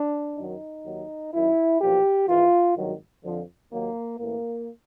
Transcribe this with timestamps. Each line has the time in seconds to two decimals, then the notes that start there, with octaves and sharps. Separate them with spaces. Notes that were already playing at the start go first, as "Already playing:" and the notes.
Already playing: D4
0.37 F#2 D#3 F#3 D#4
0.85 D#2 D#3 F#3
1.33 F#2 D#3 F#3 E4
1.80 B1 A#2 F3 G4
2.28 G#1 G#2 E3 F4
2.77 G#1 G2 D#3 F#3
3.24 F2 D3 F3
3.71 D#2 D#3 F#3 A#3
4.19 A1 A2 E3 A#3